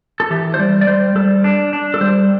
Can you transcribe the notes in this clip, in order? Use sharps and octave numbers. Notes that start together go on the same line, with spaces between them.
A4
E3 G4
C5
G3 D5
D5
G3 C5
G3 A4
D4
D4
A4
G3 C5